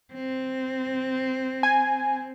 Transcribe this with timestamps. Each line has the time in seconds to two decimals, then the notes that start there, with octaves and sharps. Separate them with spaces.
0.14 C4
1.63 G#5